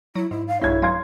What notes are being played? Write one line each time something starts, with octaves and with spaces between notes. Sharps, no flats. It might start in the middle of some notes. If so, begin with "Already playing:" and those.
F#3 E4
G#2 E4
F5
B1 G2 D#3 E4 C#5 G#6
F#3 F5 C6 G#6